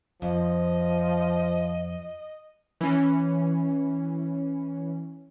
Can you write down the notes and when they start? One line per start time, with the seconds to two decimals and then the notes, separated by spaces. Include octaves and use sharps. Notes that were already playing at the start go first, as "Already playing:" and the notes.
0.22 F2 F3 D#5
2.81 E3 C#4